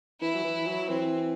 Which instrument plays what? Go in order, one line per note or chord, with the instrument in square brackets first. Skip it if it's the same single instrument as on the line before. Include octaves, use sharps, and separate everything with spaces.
[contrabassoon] E3 [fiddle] E4
[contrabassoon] F#3
E3
F#3
[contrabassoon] E3 [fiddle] C4